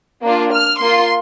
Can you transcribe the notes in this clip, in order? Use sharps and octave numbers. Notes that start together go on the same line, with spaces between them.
A#3 D4 F4
F6
A#3 F4 C6